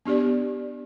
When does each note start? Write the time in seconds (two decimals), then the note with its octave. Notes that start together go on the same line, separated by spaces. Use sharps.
0.05 B3 D4 G4 D5